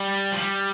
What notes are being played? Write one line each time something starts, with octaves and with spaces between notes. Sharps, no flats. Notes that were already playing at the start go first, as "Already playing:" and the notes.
Already playing: G3
F3
G3